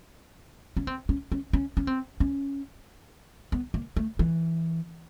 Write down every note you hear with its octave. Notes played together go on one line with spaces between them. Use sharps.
C#4
C4
C#4
C#4
C#4
C#4
C4
C#4
B3
A#3
A3
E3